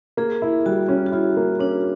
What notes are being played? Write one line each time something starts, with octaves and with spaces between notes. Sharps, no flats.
A#3 G#4
E4
G3 F#4
C#4
F#4
E4 F4
A#3
C#4 D4